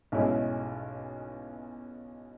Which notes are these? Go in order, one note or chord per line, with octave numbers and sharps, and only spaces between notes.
B1 B2 G#3 C#4 E4